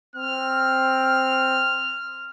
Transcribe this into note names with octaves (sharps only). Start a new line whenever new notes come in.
C4 F6